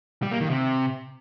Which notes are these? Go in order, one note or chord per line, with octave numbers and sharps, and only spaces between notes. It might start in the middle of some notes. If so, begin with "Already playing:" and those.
G3
A#3
D#3
C3